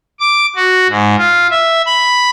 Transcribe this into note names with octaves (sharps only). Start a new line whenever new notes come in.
D6
F#4
G#2
F4
E5
B5